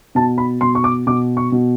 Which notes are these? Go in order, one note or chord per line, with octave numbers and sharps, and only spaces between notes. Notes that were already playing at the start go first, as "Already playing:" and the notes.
B2 A5
B5
B2 C6
C#6
D6
B2 D6
C#6
B2